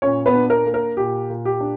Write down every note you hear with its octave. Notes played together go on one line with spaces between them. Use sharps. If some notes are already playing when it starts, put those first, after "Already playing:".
A#2 C#4 C#5
B3 B4
D4
A#4
A#3
A#4
A#2 G4
A#2
G4
D4